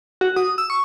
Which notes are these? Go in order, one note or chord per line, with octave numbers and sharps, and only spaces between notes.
F#4
D#6
E6
C#6